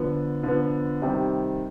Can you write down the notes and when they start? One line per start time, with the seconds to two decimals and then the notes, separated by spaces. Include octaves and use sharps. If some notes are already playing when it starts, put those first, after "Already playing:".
Already playing: D3 F3 B3
0.43 D3 F3 B3
1.02 C3 D#3 G3